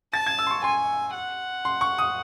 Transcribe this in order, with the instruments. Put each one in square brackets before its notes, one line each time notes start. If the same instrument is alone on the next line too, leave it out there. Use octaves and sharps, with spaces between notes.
[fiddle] A5 [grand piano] A6
[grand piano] G#6
E6
C6
C#6
[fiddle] G#5 [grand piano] C6
[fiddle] F#5
[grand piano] C6
C#6
D#6